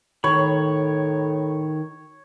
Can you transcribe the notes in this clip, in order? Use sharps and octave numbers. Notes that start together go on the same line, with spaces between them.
A2 D#3 C#5 B5